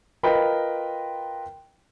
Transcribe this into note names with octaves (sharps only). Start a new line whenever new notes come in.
F4 A#4 B4 D#5 G5 B5